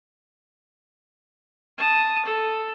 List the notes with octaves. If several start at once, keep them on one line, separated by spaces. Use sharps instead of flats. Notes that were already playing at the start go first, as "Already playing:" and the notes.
A5 D#6
A4